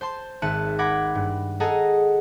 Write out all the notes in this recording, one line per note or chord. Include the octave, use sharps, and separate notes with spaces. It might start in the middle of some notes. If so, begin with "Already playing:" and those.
C5 A5 C6
G#1 E5 A5 F#6 C#7 D#7
F#5 B5 D6 G#6 A#6
G2
G#4 A4 D#5 F#5 A5 A#5